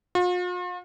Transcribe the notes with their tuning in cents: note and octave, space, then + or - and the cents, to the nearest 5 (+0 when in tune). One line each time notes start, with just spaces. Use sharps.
F4 +45